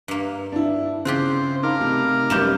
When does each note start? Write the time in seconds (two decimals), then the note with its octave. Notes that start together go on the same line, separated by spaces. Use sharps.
0.08 G2 A#3
0.52 D4 E4
1.05 C#3 C4 F4 G4 C5 F#6
1.63 D#4 A#4 F5 B5 D6 F6
1.81 C3 A3
2.30 F#2 G3 A#3 B3 G6 E7